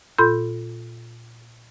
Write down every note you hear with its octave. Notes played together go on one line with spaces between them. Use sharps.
A#2 F4 A4 B5 C6 G6